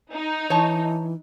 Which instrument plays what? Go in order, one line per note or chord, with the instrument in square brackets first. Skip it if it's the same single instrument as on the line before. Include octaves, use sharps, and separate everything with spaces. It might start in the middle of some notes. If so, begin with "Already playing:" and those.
[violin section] D#4
[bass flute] E3 [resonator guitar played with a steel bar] C#5 A5